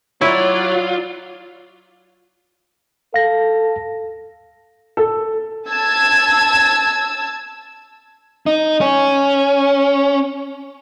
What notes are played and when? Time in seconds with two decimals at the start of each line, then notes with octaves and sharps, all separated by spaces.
0.21 F#3 E4 F4 C#5 D5
3.14 A4 F5 A#6
4.97 A4
5.68 A5 E6 G#6
8.46 D#4
8.81 C#4